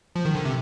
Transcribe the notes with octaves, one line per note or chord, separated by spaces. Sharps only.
F3
D#3
D3
C3